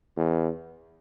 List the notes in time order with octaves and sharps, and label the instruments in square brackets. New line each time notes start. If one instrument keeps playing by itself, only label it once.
[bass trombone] E2